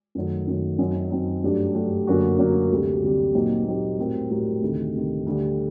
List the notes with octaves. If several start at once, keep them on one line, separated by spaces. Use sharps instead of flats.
F#2 D#3 F#3 A3
F#2 D#3 F#3 A3
F#2 F#3 C4 D#4
F#2 F#3 C4 D#4
G2 F#3 A3 D4 G4
G2 F#3 A3 D4 G4
F#2 D3 F#3 A#3 F#4
F#2 D3 F#3 A#3 F#4
D2 C3 G3
D2 C3 G3
A#2 F#3 C4 D#4 G4
A#2 F#3 C4 D#4 G4
A2 G3 C4 F#4 A#4
A2 G3 C4 F#4 A#4
D2 C3 D#3
D2 C3 D#3
D2 D3 G3